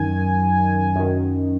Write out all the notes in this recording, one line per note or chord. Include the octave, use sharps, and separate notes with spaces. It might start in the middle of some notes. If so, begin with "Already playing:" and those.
Already playing: F#2 D#3 G#5
F#2 D#3